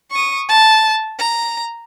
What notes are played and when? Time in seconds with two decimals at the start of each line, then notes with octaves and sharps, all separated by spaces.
0.11 C#6 D#6
0.49 A5
1.19 A#5